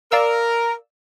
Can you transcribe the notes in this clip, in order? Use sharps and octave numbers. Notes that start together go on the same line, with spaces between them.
A#4 D5 F5 E6